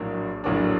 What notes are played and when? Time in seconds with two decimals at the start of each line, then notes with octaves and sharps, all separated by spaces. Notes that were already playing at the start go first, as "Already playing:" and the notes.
Already playing: A#1 A2 F#3 A#3 D4
0.44 A#1 A2 F#3 A#3 D4